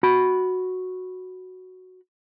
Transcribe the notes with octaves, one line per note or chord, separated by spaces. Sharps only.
F#4 B5